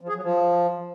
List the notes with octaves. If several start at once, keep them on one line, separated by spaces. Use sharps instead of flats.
F3
G#4
F#3
F3